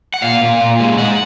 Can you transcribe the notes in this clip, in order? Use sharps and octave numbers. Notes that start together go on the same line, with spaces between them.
F#5
A#2 F5
A#2
A#2
G#3
G#3 F#5